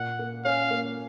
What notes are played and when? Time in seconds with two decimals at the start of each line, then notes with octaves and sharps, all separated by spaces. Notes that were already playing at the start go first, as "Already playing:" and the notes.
Already playing: A#2 F#5
0.19 A#3
0.45 C#4 F5
0.71 A#3